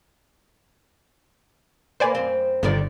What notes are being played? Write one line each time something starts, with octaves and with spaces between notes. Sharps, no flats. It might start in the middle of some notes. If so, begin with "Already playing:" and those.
A#3 B4 C5 D5 G#5
F#2 C4
G1 D3 D#3 D5